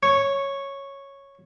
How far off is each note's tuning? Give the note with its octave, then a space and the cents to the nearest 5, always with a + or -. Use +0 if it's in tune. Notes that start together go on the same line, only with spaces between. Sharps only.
C#5 -5